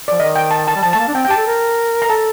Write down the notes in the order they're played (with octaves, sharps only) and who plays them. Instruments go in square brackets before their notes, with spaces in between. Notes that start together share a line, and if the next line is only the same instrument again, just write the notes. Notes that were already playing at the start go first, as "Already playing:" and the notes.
[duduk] F3 [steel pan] D5
[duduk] D#3 [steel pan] D#5
[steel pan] G5
A5
A5
[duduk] G3
[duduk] F3 [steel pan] A5
[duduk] A3 [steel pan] A5
[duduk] A#3
D4
[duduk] C4 [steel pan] G5
[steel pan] G5
[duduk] G4 [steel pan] A5
[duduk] A4
A#4
[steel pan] A#5
[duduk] A#4
[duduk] A4 [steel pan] A5